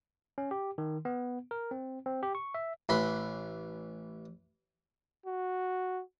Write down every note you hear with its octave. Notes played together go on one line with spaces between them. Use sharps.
C#4
G4
D#3
B3
A#4
C4
C4
G4
C#6
E5
A1 E3 B5 C6
F#4